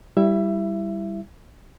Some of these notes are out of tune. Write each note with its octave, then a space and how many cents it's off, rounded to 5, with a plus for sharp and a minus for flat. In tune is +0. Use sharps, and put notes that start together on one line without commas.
G3 +0 E4 +0 E5 +20